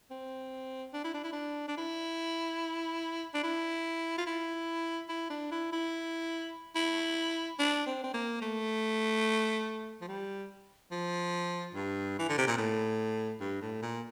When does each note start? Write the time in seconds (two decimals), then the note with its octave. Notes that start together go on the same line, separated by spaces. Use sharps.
0.11 C4
0.94 D4
1.04 E4
1.14 D4
1.24 E4
1.33 D4
1.68 D4
1.78 E4
3.34 D4
3.43 E4
4.18 F4
4.27 E4
5.09 E4
5.30 D4
5.52 E4
5.73 E4
6.76 E4
7.59 D4
7.87 C4
8.04 C4
8.14 A#3
8.42 A3
10.01 F3
10.08 G3
10.92 F3
11.75 G2
12.19 E3
12.29 D3
12.38 C3
12.47 A#2
12.58 A2
13.40 G2
13.62 A2
13.82 A#2